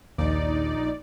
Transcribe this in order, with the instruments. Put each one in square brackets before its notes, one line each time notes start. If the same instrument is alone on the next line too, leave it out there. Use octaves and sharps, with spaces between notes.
[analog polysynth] A#1 D#4 D5 [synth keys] D#2